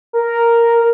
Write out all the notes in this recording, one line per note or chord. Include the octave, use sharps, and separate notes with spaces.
A#4